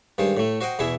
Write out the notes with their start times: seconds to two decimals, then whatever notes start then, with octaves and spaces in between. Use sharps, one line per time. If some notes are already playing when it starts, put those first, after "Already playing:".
0.18 G2 D#3 G#3 C5
0.37 A2 A3
0.61 F#4 C5 D#5 F#5 G5
0.79 E2 B2 E4 G#4 E5